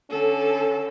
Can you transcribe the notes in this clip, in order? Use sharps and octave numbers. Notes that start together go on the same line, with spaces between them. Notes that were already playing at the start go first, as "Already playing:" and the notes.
D3 C#4 A4